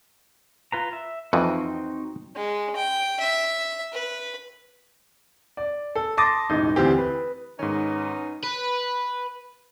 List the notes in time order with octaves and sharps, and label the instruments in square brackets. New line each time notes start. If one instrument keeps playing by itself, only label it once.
[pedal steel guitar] F4 B4 A#5
E5
[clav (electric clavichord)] F2 E3 F3 [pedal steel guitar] C4 D#4 F#4
[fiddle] G#3
G5
E5
B4
[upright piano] D5
A4
A5 C6 D6 D#6 A6 A#6
E1 A1 D#4
D2 E3 C4 G4
B4
[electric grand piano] G#2 D#3 [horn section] B3 C#4 D#4
[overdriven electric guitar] B4